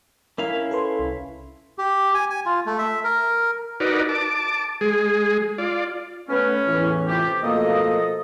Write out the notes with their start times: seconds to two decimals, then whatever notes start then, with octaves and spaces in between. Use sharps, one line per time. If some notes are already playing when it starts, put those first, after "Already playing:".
0.38 C#4 E4 A#4 F5
0.71 A4 B4 C6
0.99 C2
1.78 G4
2.15 G#5
2.30 G#5
2.46 F4
2.66 A3
2.78 E5
3.04 A#4
3.80 D#4 F#4 A#4 B4 D5
4.09 A5 D6
4.81 G#3 G#4
5.58 F4 D5
6.29 A3 B3 C#4
6.66 E2 A2 E3
7.08 C3 F4 G4
7.43 B2 F3 A3 A#3 A4 D#5